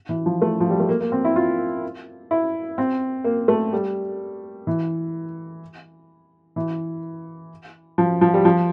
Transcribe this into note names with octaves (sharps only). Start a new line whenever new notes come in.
E3
F3
A3
F3
G3
A3
A#3
A#3
C4
E4
F4
E4
C4
A#3
A3
G3
E3
E3
F3
F3
G3
F3